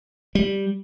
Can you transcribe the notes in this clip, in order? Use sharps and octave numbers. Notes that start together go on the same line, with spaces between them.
G3